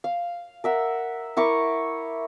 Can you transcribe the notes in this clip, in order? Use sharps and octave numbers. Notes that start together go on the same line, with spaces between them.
F5
A#4 E5 F#5
E4 A#4 C#6 D6